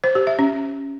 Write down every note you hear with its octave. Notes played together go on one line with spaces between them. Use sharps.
C5
G4
E5
C#4